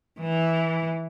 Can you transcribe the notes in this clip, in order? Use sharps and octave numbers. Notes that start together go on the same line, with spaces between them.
E3